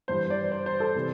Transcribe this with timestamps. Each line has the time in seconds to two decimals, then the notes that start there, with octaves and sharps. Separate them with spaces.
0.08 G2 E3 C5
0.30 D5
0.52 C5
0.66 C5
0.80 A4
0.95 C3 E3